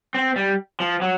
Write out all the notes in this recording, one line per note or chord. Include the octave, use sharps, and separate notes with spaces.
C4
G3
F3
F#3